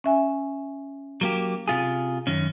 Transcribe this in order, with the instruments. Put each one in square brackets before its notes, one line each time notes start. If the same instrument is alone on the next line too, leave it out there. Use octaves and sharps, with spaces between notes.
[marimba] C#4 E5 G#5
[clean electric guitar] F#3 A#3 G4
C3 F4 G#4
F#2 D#3 C#4